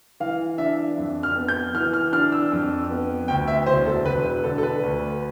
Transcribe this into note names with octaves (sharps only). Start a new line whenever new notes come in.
E3 F5
D4 E5
F2
F6
B3
G6
E3 F6
F6
D4 F6
E6
F2
B3
D2 G5
E5
E1 C5
A4
E1 B4
B4
D3 A4
A4
B4
D2